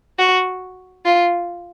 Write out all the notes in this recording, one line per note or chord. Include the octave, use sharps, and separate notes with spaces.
F#4
F4